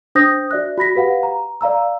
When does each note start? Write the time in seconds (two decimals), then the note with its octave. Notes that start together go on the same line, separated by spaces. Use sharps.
0.15 D4 C5 D#6 G6 A#6
0.51 F#4 D5 E5 F#6
0.78 F#4 B5 A#6 B6
0.95 G4 B4 F5 F#5
1.23 A#5
1.61 D5 F5 A#5 E6